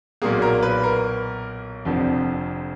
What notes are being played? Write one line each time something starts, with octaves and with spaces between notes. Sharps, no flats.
B1 A#2 F#3 A#3 G#4
A#4
B4
A#4
F1 F2 D3 F3